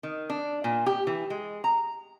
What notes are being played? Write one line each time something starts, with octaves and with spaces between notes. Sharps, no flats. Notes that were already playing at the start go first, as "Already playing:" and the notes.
D#3
D4
A#2
G4
E3
G#3
A#5